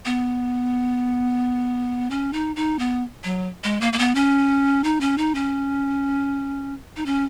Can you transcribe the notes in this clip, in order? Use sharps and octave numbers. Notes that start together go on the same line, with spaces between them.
B3
C#4
D#4
D#4
B3
F#3
G#3
A#3
A#3
B3
C#4
D#4
C#4
D#4
C#4
D#4
C#4